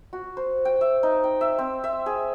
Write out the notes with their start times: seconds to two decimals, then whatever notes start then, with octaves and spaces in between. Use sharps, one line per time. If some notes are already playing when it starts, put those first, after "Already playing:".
0.13 F#4
0.37 C5
0.65 G5
0.81 E5
1.03 D#4
1.24 G5
1.41 E5
1.59 C4
1.84 E5
2.06 G#4